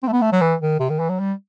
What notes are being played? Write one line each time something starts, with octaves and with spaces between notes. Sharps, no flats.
C4
A3
B3
A3
F#3
E3
D#3
C3
D#3
E3
F#3
G3